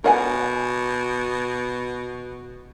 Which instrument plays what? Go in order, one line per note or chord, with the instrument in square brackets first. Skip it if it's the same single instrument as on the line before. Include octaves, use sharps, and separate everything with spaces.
[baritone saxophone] B2 [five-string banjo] A#4 F#5 G#5